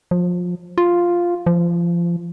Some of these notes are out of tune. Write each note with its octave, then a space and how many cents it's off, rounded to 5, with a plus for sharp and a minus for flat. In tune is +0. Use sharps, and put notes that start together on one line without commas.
F3 +25
F4 +0
F3 -25